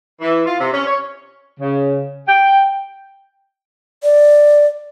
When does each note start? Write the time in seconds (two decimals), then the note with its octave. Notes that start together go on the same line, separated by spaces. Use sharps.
0.21 E3
0.46 F4
0.60 C3
0.72 C#4
0.86 C#5
1.60 C#3
2.27 G5
4.03 D5